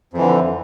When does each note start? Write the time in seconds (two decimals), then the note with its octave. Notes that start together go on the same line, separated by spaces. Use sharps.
0.13 F2
0.17 E3
0.21 D3